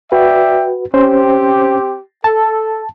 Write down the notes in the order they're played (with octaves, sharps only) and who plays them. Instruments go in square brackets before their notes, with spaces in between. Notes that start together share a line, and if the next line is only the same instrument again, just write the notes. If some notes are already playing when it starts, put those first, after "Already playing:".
[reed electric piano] F#4 B4 [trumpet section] D5 E5 G5
[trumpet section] C4 G4 [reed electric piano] C#4 C5
[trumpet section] A4 [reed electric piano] A5